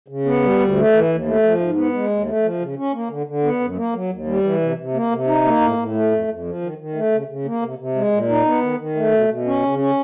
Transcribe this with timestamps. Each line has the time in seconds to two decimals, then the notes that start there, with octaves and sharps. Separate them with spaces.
0.08 C#3
0.25 B3
0.43 G3
0.59 D2
0.76 A3
0.92 E3
1.09 D#2
1.26 A3
1.43 F3
1.59 G#2
1.76 B3
1.93 G#3
2.09 D#2
2.26 A3
2.43 F3
2.60 C#3
2.77 C#4
2.93 A#3
3.10 D3
3.26 D3
3.43 B3
3.60 F#2
3.77 A#3
3.93 F#3
4.10 D#2
4.27 G3
4.44 E3
4.61 C3
4.78 C3
4.94 A#3
5.11 C3
5.27 D#4
5.45 A#3
5.61 A2
5.77 A2
5.94 A3
6.11 F2
6.28 F2
6.45 F3
6.61 D#3
6.78 D#3
6.94 A3
7.12 C#3
7.28 C#3
7.45 A#3
7.62 C3
7.79 C3
7.95 G#3
8.12 A#2
8.29 D#4
8.45 B3
8.62 D#3
8.79 D#3
8.95 A3
9.12 B2
9.29 B2
9.46 C#4
9.62 C#3
9.79 C#4